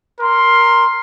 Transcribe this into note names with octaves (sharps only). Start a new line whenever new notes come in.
A#4 C6